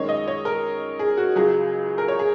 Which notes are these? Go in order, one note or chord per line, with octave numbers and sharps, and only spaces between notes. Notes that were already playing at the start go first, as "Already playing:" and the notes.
Already playing: F#2 D#3 G#3 C#5
D#5
C#5
A#4
G#4
F#4
C#2 C#3 F#3 G#4
A#4
C#5
G#4